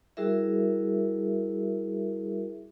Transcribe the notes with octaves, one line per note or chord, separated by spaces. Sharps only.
G3 E4 F#4 G#4 A#4 E5